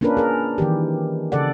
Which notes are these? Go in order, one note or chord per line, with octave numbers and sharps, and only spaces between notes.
A#3 C#4 D4 F4 A#4 B4
G#4 A#4
D#3 E3 G4
C#3 A4 D5 F#5